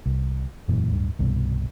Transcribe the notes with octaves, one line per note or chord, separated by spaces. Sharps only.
C2
E1 F#2 A#2 E3
D1 G2
C2 G2 B2